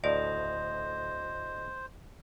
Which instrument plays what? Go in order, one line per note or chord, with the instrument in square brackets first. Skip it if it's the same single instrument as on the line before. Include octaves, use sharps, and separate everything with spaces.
[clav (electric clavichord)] D2 A2 [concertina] C5 [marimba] D5 [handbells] D#5